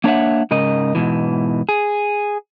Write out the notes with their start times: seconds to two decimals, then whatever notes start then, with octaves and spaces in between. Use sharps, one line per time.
0.04 A#3 D4 C#5 D#5 E5 F#5
0.51 G#2 C#3 A#4 D#5
0.95 G#2 B2 E3
1.69 G#4